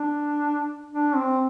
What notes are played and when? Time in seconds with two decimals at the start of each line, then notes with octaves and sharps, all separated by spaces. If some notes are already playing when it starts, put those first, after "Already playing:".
Already playing: D4
0.90 D4
1.16 C4